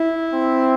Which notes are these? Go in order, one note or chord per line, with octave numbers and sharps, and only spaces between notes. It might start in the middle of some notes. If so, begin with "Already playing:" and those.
Already playing: E4
C4